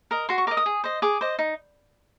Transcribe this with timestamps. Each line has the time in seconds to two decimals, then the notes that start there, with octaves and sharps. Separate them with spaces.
0.11 A#4 D#5
0.29 F#4 C6
0.38 C#6
0.47 A#4 D6
0.51 D#5
0.57 D#6
0.66 G#4
0.84 C5 D#5
1.02 G#4 D6
1.21 C5 D#5
1.39 D#4